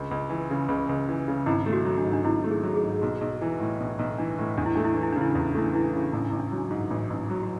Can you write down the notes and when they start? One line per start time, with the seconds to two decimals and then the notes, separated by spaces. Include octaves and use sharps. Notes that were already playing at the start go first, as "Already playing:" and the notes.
Already playing: C#2 D4
0.11 C#2
0.30 E3
0.50 C#3
0.68 C#2
0.89 C#2
1.09 E3
1.28 C#3
1.46 G#1 E4
1.66 A3
1.73 F#4
1.85 F#3
1.98 D4
2.04 G#2
2.13 D4
2.24 G#1 E4
2.44 A3
2.51 G#4
2.63 F#3
2.76 G#4
2.83 G#2
3.02 B1 F#4
3.21 B1
3.41 E3 E4
3.60 A2
3.80 B1 D4
3.99 B1
4.18 E3 D4
4.39 A2
4.58 E2 D4
4.66 E4
4.76 A3 D4
4.84 E4
4.94 E3 D4
5.03 E4
5.12 C#3 D4
5.21 E4
5.31 D4
5.35 E2 E4
5.48 D4
5.55 A3 E4
5.66 D4
5.73 E3 E4
5.85 D4
5.93 C#3 E4
6.03 D4
6.12 A1 E4
6.21 D4
6.30 A1 E4
6.40 D4
6.48 F#3 E4
6.58 D4
6.71 G#2
6.90 A1 D4
7.10 A1
7.16 E4
7.30 F#3
7.43 F#4